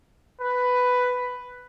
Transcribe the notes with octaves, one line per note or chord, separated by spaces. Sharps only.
B4